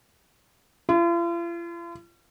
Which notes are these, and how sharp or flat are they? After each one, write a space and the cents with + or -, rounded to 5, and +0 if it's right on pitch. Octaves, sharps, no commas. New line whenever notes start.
F4 -45